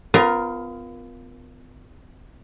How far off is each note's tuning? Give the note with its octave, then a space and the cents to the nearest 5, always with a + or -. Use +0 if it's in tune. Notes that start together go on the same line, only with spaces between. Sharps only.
B3 +35 F4 +0 A#4 +10